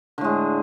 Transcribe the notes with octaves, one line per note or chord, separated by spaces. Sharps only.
A2 D3 G#3